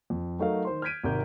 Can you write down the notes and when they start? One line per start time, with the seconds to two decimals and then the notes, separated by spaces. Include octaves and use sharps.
0.10 F2
0.39 F#3 A3 D#4 A4 A#4 F5
0.65 D#3 C5 C6
0.82 F6 G6 G#6 B6 D7 D#7
1.04 G#1 C3 D#3 A#4 G6